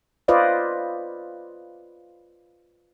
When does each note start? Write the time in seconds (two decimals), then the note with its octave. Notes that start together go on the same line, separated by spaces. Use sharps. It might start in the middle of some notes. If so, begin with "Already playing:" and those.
0.28 F4 B4 C5 D5 D#5 F5